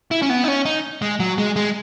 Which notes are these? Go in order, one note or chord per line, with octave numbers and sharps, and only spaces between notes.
E4
C#4
B3
D#4
C#4
D#4
G#3
F#3
G#3
G#3